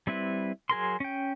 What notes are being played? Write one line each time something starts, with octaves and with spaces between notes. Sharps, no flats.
G3 C4 E4 B4
F#3 G#4 A#4 C6
C#4 G5